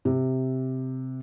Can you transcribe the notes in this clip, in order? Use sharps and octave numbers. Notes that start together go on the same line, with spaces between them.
C3